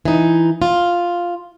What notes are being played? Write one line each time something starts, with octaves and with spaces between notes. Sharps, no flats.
E3 D#4
F4